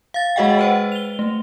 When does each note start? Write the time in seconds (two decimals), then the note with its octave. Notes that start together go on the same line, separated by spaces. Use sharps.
0.14 F5 A6
0.36 G#3 F#4 G#4 D#5 F#5 G5
0.59 B4 C5 F#5
0.92 F7 G7
1.19 A3